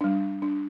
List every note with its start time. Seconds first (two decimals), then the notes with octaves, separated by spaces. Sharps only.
0.01 G3 D4
0.42 D4